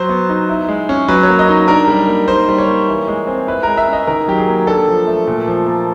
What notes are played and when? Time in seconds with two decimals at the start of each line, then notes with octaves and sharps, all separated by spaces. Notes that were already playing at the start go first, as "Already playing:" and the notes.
Already playing: F#3 C5
0.09 B3
0.29 D#4
0.49 E4
0.68 G#3
0.89 C#4
1.08 F#3 B4
1.23 C#5
1.29 A#3
1.39 D#5
1.49 D#4
1.68 D4 A#4
1.88 G3
2.08 A#3
2.28 D#4 C5
2.48 G3
2.58 C#5
2.67 A#3
2.88 E3
3.08 G#3
3.27 C4
3.47 E4 B4
3.63 G#3 A#4
3.77 E5
3.88 C#4 D#5
4.07 D#3 A#4
4.28 F#3 G4
4.38 G#4
4.48 A#3
4.67 D4 A4
4.88 F3
5.07 A3
5.27 A#2
5.48 F3
5.67 A#3